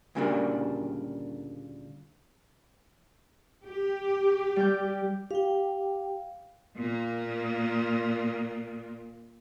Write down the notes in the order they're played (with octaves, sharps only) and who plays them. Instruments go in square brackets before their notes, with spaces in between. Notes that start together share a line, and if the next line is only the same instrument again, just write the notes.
[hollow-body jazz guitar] D2 A#2 C#3 G3 A#3 D4
[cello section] G4
[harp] G3 G5 G6
[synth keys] G4 [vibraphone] F5 G5
[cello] A#2 A#3